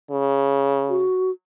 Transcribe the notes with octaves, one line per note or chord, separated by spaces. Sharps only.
C#3
F#4